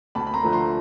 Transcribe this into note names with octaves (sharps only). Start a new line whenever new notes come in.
D2 A5 B5
B5
A#5 C6
D3 F3 A3
A#5 C6